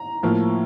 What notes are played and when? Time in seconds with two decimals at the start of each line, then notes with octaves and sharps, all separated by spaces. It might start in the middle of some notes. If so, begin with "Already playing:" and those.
Already playing: A#5
0.23 A2 F3 A#3